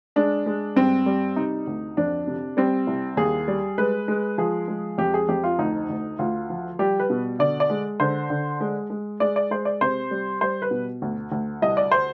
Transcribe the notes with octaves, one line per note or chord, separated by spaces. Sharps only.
G#3 D4
G#3
G2 C4
G3
C3 D#4
D2
F2 D4
C3
G3 C4
C2
D#2 G#4
G3
G#3 B4
G#3
F3 G#4
G#3
F2 G4
G#4
F2 G4
F4
D2 D#4
D2
D2 F4
F3
G3 G4
B4
B2
D3 D5
D5
G#3
D3 C5
D3
G#3
G#3
G#3 D5
D5
G#3 C5
D5
C3 C5
G3
G3 C5
B4
B2
D2
D2
C2 D#5
D5
C5